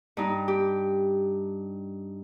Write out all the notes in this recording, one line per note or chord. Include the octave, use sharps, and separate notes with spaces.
G2 D#4
G4